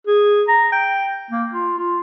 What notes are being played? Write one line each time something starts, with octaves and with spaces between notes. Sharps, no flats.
G#4
A#5
G5
A#3
F4
F4